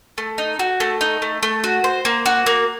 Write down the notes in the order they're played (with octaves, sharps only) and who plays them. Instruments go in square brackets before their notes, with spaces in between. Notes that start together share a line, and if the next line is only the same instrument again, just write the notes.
[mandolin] A3
D#4
F#4
A3
D#4
A3
A3
F#4
C5
A#3
F#4
A#3